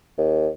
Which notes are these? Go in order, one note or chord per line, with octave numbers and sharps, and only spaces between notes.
D#2